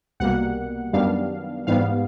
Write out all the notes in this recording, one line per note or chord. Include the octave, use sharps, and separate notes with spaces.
C2 B2 G3 A#3 F#5
F#2 D#3 G3 B3 D4 F5
G#2 E3 G3 B3 F5